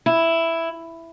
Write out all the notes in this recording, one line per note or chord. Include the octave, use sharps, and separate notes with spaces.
E4